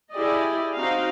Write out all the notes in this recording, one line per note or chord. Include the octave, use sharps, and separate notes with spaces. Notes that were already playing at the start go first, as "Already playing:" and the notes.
E4 G4 G#4 D5 D#5
C4 D#4 F#4 F5